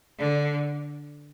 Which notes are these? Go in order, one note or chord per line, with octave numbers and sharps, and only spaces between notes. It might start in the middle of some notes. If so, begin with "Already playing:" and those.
D3